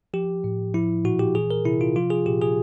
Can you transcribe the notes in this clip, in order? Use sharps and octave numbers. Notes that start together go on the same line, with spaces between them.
F3 G4
A2
F3 E4
A#2 F#4
G4
E3 G#4
A#4
C3 E4
F4
F3 F4
G#4
A#2 G4
G#4